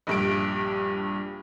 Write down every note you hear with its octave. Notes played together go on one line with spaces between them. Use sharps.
A#1 G2 D7